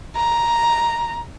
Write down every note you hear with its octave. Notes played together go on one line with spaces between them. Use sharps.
A#5